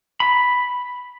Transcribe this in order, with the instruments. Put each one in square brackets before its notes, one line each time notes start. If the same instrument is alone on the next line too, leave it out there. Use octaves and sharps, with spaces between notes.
[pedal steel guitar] B5